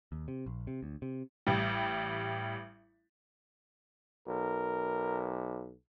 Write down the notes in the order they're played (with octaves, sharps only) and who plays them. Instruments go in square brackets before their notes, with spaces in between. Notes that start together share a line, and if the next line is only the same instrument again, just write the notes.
[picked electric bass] D#2
C3
A#1
C3
D2
C3
[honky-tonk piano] A1 G3
[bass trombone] B1 [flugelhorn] A#4